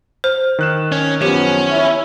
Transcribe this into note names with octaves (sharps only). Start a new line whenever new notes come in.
C5 F6
D#3 F#6 E7
C#4
F#2 F3 B3 C#4 G4
E4